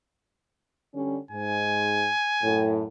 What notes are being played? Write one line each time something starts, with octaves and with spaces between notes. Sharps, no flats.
D3 G3 C#4
G#2 G#5
F#2 A2